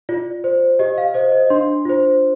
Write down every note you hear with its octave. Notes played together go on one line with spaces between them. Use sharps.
F4 D5
C5
G4 D#5
F5
C5 D#5
D#5
D4 C6
F4 C5